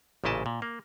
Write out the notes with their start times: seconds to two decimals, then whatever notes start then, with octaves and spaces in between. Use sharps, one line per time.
0.24 A1 A#2 C#3 E4 D#5 A5
0.46 A#2
0.62 A#3